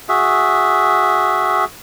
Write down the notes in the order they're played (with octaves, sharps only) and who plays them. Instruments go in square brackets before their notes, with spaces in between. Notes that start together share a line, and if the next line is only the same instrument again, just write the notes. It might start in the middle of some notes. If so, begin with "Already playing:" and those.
[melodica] F#4 G#4 E5